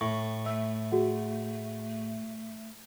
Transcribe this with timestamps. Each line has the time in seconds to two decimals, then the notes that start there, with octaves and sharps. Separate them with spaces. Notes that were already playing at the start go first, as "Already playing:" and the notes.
0.01 A2 C#6
0.46 A3 E5 E6
0.92 F#4 G#4 F#5